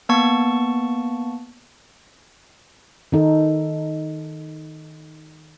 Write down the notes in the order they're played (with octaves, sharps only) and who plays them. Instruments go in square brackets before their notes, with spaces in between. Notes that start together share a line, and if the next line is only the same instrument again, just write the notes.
[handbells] A#3 B3 A5 C#6
[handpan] D#3 D#4 A4